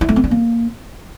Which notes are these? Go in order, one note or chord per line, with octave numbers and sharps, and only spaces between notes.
E4
A3
C4
D4
A#3